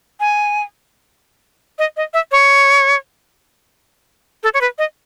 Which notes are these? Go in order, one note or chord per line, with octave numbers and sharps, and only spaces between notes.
G#5
D#5
D#5
E5
C#5
A4
C#5
B4
D#5